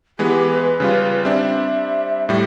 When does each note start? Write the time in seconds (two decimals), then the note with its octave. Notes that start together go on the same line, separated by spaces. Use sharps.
0.19 E3 G#3 B3 G4
0.51 B4
0.80 C#3 G3 F4
1.24 G3 C4 D4 E5
2.29 A2 G3